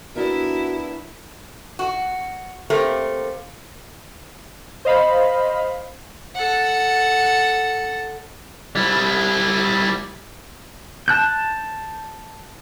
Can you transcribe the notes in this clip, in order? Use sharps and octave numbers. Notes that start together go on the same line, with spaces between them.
B3 D4 E4 F#4 A#4
F#4
A3 A#3 C4 G4 A#4
C5 D#5 F5 B5
A4 F#5
G3 E4
A5 F#6 G6